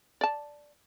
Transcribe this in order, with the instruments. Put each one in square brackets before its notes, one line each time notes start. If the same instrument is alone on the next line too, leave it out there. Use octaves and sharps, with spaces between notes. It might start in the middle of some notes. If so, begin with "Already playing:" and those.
[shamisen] D5 A5